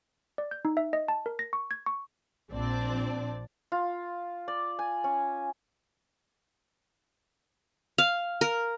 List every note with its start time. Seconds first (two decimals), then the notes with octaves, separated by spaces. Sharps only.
0.38 D5
0.51 G6
0.65 D#4
0.77 E5
0.93 D#5
1.08 A5
1.26 A#4
1.39 A#6
1.53 C#6
1.71 G#6
1.86 C#6
2.52 A#1 C4 D4 D5
3.72 F4
4.48 D5
4.79 G#5
5.04 C#4
7.98 F5
8.41 A#4